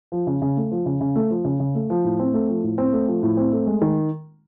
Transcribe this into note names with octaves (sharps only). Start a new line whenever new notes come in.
F3
C#3
C#3
A3
F3
C#3
C#3
A3
F3
C#3
C#3
A3
F3
A2
C4
A3
F3
A2
C4
A3
F3
A2
C4
A3
G#3
D#3